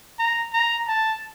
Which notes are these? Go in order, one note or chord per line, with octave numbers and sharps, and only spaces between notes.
A#5
A#5
A5